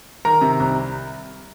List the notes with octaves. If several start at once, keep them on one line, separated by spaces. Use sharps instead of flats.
D#3 A#4 A#5
C3
C2